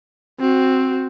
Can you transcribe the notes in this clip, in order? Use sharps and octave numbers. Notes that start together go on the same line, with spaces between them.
C4 F#4